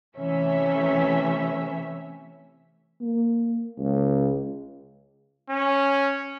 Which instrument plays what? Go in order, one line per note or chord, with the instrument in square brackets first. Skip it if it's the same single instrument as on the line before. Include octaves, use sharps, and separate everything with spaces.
[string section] C3 E3 A3 C#4 E5
[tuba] A#3
C#2
[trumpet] C#4